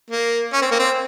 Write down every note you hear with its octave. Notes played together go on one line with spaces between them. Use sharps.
A#3
C#4
C4
A#3
C4